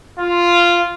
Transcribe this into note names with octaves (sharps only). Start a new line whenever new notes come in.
F4